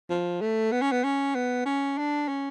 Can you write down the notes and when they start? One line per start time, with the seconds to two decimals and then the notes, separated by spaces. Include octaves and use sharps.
0.10 F3
0.41 A3
0.72 B3
0.82 C#4
0.92 B3
1.04 C#4
1.35 B3
1.66 C#4
1.98 D4
2.28 C#4